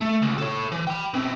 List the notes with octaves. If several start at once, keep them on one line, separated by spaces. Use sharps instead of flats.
A3
C#2
A4 C#5
E3
G5 B5
B2 C4